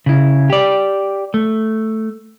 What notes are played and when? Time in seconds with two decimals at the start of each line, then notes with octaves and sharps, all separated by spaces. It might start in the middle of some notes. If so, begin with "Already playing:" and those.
0.06 C#3 E4
0.50 G4 D5
1.34 A3